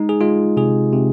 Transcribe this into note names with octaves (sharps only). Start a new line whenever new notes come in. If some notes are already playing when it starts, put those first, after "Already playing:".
Already playing: G#3 D#4
G#4
G#3 F4
C3 G#4
C3